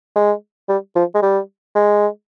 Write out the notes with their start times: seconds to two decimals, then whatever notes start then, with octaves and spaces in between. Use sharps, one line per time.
0.16 G#3
0.69 G3
0.96 F3
1.15 G#3
1.23 G3
1.75 G#3